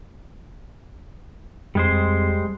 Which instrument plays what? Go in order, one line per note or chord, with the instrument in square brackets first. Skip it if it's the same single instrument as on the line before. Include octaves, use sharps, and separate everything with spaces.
[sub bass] F2 [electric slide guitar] G3 G#3 C5